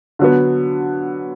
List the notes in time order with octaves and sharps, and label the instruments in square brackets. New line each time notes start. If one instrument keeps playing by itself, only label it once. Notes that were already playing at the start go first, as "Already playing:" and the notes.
[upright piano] D3 F#3 B3